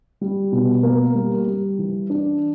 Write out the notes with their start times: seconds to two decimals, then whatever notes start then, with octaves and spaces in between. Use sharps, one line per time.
0.21 G3
0.52 B2
0.83 A#3
1.15 G3
1.47 G3
1.79 E3
2.10 D4